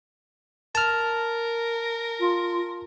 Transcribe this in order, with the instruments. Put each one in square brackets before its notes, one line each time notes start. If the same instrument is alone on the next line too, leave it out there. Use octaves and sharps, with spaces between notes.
[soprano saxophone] A#4 [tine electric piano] A5 F6
[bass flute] F4